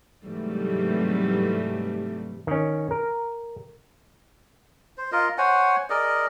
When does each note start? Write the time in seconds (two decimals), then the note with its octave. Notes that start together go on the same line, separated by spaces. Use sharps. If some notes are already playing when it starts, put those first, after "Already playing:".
0.25 G#2 C3 E3 F#3 G3 A3
2.47 D#3 C#4
2.91 A#4
4.98 C5
5.12 F4 A#4 D#5
5.38 C5 C#5 F#5 G#5
5.90 G#4 A#4 D5 D#5